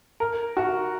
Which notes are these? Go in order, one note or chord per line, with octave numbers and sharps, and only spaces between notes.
A#4
F#4